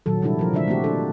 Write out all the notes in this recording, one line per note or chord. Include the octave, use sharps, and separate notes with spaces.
A#2 D#3 F#3 A4
C3 G3 D4 E4 A4
F3 A#4
D3 G#3 D4 F#4 E5
A3 A#3 C4 E4 F#4 G4
D4 A4